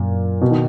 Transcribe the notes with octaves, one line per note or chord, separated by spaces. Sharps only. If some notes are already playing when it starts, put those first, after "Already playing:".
Already playing: F#2 A#2
B2
D#3